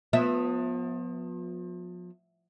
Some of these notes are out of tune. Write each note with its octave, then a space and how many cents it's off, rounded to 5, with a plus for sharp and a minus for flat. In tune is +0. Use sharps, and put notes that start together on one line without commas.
F3 +35 B3 -10 E5 +0